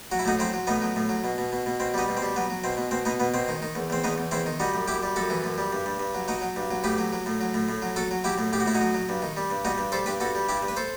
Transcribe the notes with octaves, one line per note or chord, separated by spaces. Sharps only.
F#3 F#4
E4
A2 D#4 F#4
F#3 C4 E4
F#3
A2 B3 D#4
F#3
A2
F#3
B2
B2
B2
B2
B2 C4
G3 B3 D#4
B2
C4
G3
F#3 B3
F#3
B2 C4
B2
B2 C4
B2 B3 D#4
B2 B3
B2 C4
D#3
D#3
E2
E2 C4
E2 B3 D#4
E2
E2 C4 E4
D#3
G3 D#4 F#4
F#2
F#2 E4 G4
G3
F#2 F#4 A4
E3
F#2
G3
G2
G2
G2
F#3
F#3 D#4 F#4
F#3
G2
F#3
A2 G4 B4
F#3
F#3
A2
F#3
A2
A2
F#3
F#3 F#4 A4
F#3
F#3 E4 G4
A2
A2 G4
F#4
A2 E4
D#4 F#4
F#3
F#3
G2
D#3
G3
G2
G3 D#4 F#4
G2
G3 A4 C5
G2 G4 B4
G2 F#4 A4
G3
G2 E4 G4
G2
B4
A4 C5